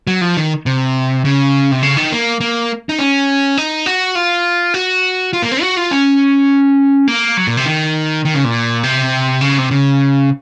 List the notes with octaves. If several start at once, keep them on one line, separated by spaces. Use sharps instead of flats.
F#3
F3
D#3
C3
C#3
C3
C#3
D#3
A#3
A#3
D#4
C#4
D#4
F#4
F4
F#4
F4
A#3
C4
F#4
F4
C#4
A#3
F#3
A#2
C3
D#3
D#3
C#3
A#2
C3
C#3
C3
C#3